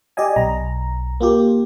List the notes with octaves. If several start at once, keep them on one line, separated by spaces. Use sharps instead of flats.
G4 D5 D#5 G#5
B1 A#5
A#3 F4 G4